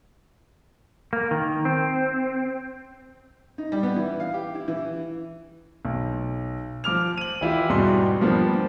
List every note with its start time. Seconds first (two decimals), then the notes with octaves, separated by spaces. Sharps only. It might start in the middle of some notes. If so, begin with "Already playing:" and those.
1.13 A#3
1.31 D#3
1.65 C4
3.58 D#4
3.72 G3
3.83 B3
3.96 E3
4.20 F5
4.34 G4
4.55 E4
4.68 E3
5.85 B1
6.84 F3 D6 F6 F7
7.18 D#7 F#7
7.41 E3 E4 F4 G4
7.69 E2 G#2 B2 G3 F#4 C6
8.21 F3 G3 A#3 B3 D4